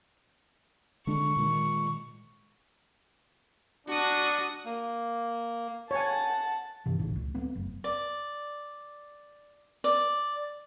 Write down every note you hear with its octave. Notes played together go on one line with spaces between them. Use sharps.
D3 G#3 D4 C#6
A#2 D#3 G#3
D4 F#4 D#6
A#3
C#5 F#5 G#5 A5
G2 C3 E3
D#1 A1 A2 C#3
C#2
F#3 A3 B3 C4
F#1
D5
D5